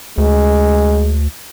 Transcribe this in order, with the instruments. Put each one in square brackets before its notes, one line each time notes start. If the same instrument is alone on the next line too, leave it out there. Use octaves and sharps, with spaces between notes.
[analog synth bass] D2 [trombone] G#3